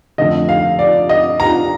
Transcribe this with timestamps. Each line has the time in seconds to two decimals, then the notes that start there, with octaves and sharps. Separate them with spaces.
0.18 F2 D3 A3 D#5
0.49 F5
0.79 D5
1.09 D#5
1.40 A#5